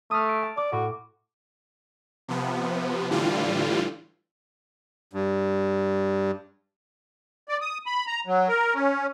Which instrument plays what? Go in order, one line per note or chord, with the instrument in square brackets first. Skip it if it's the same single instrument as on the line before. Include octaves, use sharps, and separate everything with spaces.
[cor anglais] A3 [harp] D#6 F6
[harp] D7
A5
[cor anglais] D5 [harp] D6
[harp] A2 [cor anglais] F#4
[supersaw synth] C3 F3 B3
A2 D3 E3 G3 F4
[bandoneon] G2
[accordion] D5
D#6
B5
A#5
F#3
A#4
C#4